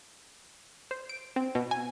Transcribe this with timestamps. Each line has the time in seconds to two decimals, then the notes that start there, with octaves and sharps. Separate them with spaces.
0.91 C5
1.09 D7
1.36 C4
1.55 B2
1.71 G#5